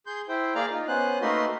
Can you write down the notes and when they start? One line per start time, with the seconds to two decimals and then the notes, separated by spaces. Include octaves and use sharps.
0.06 G#4 C6 G6
0.29 E4 C5 G5
0.55 A#3 G#4 D5 F5 A#5 F6
0.70 D#4 F4
0.88 B3 C#4 C5 F#6
1.21 A3 A#3 D#4 F#4 B4 C6